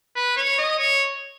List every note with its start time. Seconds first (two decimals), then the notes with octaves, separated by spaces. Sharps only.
0.16 B4
0.37 C#5
0.58 D#5
0.79 C#5